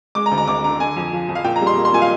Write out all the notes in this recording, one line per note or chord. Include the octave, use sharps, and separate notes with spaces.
G#3 D6
A#5
D2
A#5
D2 D6
D3 A#5
D3 G#5
F2
F3
F2
F5
A#2 G5
A#5
G3
C6
A#3
C6
A#2 G#5
F5